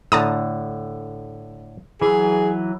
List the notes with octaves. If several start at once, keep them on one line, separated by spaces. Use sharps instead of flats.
A2 D3 A5 A#5 D#6
E3 F#3 G#4